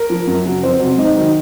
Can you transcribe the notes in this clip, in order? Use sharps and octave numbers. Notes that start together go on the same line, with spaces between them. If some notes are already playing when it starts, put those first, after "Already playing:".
Already playing: A#4
F3
F#2
C#3 F#3
F2 C5
C3 F#3
G#2 D#4
D#3 F#3